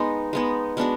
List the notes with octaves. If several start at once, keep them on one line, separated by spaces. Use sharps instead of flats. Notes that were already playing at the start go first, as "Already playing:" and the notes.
Already playing: G#3 B3 D#4
G#3 B3 D#4
G#3 B3 D4 F#4